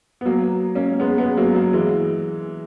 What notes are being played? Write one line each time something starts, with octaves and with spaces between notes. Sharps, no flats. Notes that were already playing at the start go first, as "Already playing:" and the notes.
B3
F#3 A#3
A#3 C#4
G#3 B3
G#3 B3
F#3 A#3
F#3 A#3
E3 G#3